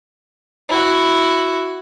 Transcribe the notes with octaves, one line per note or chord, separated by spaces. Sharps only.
E4 F#4